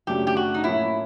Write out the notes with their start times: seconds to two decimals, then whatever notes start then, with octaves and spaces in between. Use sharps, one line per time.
0.07 F#2 C#3 F#3 A3 D4 G4
0.27 G4
0.37 F#4
0.54 D#4
0.64 A2 F3 A#3 C#4 E4